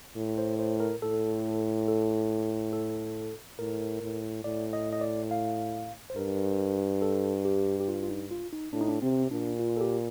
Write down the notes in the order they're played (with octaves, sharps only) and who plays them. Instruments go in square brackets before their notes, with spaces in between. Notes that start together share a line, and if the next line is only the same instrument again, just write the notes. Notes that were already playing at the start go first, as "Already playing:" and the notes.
[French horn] A2
[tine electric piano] C5
C5
A#4
[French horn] A2 [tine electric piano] A4
[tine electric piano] A4
A4
[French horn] A2 [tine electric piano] A#4
[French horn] A2
[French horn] A2 [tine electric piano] D5
[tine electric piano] D#5
D#5
D5
F5
C5
[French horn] G2 [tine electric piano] A#4
[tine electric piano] A4
G4
G4
F4
F4
D#4
F4
D#4
[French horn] A2 [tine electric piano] D4
[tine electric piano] D#4
D4
[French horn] C3 [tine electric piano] C4
[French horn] A#2 [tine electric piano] D4
[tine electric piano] F4
A4
G4